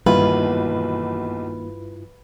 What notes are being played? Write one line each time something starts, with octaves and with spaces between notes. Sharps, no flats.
B1 E2 G2 D#3 A#3 E4 F4 B4